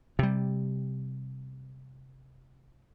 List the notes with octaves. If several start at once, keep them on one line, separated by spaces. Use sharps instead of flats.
C3 G3